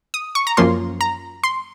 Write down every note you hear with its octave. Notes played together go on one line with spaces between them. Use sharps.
D#6
C#6
A#5
F#2 F3 A#3 C#4 F4 C6
A#5
C6